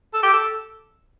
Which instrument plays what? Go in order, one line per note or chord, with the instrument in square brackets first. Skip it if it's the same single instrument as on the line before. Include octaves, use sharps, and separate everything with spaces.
[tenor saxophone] A4
G4
A4